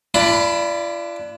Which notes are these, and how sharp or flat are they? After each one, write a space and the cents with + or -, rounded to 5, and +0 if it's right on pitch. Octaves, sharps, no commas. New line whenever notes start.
D4 +0 F4 -45 B5 +0